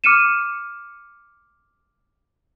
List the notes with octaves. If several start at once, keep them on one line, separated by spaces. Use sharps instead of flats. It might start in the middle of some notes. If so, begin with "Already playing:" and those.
D6 F6 C#7 D#7 E7